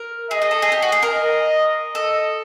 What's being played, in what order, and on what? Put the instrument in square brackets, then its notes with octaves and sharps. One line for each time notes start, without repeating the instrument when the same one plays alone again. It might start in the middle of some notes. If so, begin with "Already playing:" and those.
Already playing: [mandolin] A#4
[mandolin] G#4 [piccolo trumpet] D#5
[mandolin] G#4
A4
G#4
G4
F#4
G#4
A#4
[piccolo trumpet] D#5
[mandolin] A4 [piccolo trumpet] D#5